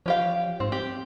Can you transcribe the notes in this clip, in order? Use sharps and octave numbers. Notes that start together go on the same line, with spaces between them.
F3 C#4 G4 F5
G#2 C4
C4 G4